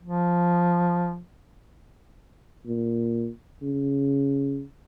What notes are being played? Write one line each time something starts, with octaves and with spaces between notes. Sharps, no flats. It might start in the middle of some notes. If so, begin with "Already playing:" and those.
F3
A#2
C#3